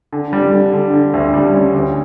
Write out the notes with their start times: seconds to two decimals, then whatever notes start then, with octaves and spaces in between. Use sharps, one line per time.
0.13 D3
0.33 G3
0.53 D3
0.73 D3
0.94 D3
1.13 D2
1.34 G3
1.53 C#4
1.74 D2